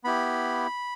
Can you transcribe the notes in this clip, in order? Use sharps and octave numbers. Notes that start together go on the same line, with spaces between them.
B3 E4 G4 B5